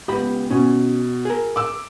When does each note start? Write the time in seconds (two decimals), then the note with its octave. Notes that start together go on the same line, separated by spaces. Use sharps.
0.08 C#2 B3 G4 D#5 B5
0.50 B2 C#4
1.25 G#4 A#4
1.56 D6 E6